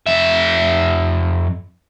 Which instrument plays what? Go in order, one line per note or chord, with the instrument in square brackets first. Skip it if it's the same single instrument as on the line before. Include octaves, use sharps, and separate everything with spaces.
[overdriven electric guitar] F2 E5